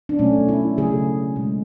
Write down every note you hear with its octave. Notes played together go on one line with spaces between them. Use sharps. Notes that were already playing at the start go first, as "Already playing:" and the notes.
D4
B2 F#3 A3 C#4
E4
C#3 F#3 A3 G#4
B2 G#3